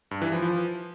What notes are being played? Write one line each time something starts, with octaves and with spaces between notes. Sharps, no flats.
G2
E3
F3
F3